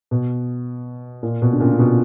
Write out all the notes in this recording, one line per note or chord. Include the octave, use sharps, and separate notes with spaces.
B2
A#2
B2
D3
A#2 C#3
C#3
B2